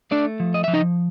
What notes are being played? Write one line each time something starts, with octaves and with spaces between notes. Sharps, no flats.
A3 D4 D5
F3
D#5
F3 E5
D#4 D#5